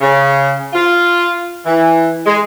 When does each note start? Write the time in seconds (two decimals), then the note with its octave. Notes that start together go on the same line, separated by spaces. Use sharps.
0.01 C#3
0.73 F4
1.66 E3
2.26 G#3